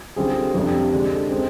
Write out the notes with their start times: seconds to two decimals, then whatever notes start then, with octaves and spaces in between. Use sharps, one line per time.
0.16 D3 G3 C4 F4 G#4
0.54 F2 C3 G3 D4 G4
0.92 D3 G#3 D4 G4
1.31 G#3 C4